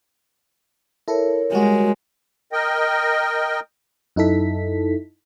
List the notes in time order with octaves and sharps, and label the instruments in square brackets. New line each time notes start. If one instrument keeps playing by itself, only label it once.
[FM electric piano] E4 A4 [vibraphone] A#4 C#5
[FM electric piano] G3 F#4 [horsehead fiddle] G#3
[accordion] A#4 D#5 G5
[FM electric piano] F#2 D#4 E4 A4 B6